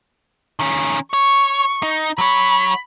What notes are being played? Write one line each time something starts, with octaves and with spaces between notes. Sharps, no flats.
D#3 C#4
C#5 C#6
D#4
F#3 C#5 B5